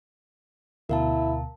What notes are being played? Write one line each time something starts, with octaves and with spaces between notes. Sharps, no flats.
D2 B2 E4 A#4 F5 A5